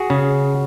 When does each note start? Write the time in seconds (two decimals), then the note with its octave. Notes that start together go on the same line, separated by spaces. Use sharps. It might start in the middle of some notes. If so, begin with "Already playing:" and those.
Already playing: F#4 G#4
0.10 C#3